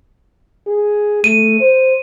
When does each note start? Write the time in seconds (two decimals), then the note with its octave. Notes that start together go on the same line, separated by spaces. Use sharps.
0.67 G#4
1.24 A3 D#7
1.61 C5